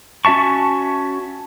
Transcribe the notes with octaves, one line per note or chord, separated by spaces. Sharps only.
C#4 F#4 E5 A5 C#6